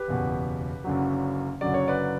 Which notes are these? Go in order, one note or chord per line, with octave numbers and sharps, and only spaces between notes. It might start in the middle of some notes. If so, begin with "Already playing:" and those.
Already playing: G4 B4
F#1 E2 B2
F#1 F#2 D3 F#3
F#1 F#2 D3 F#3 D5
C#5
B4 D5